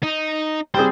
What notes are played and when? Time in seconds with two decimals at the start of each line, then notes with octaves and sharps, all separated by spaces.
0.03 D#4
0.74 G3 C4 G#4 C5